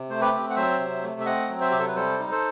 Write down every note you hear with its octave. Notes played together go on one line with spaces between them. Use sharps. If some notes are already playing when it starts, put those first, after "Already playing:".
Already playing: C3
A3 C5
G4 B4
C4
F#5
F#3 C5 E5
C3
A3
E5
C4 D#5 F#5
F#3
C5 E5
C3 G4
A4
B4
G3 A4 C5
D#4
A4 C5